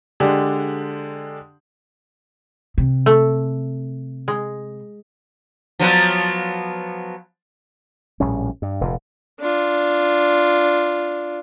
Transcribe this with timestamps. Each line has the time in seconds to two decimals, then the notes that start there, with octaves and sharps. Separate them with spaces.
0.20 D3 G#3 D4 G4
2.78 C3
3.06 A3
4.28 G#3
5.79 F3 F#3 B3
8.20 A#1 A2 G3 C#4
8.62 G2
8.81 F1 A#2
9.40 D4 F4